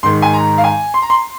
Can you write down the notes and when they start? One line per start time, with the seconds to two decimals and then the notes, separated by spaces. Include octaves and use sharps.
0.03 G#2 D#3 G#3 C6
0.22 G#5
0.34 A#5
0.58 F5
0.64 G#5
0.94 C6
1.02 A#5
1.10 C6